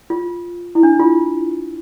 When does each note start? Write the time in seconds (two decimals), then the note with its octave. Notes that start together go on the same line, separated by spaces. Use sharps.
0.10 F4
0.75 E4
0.83 D4
1.00 F4